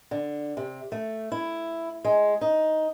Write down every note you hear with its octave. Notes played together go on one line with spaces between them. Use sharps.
D3
C3
A3
E4
G#3
D#4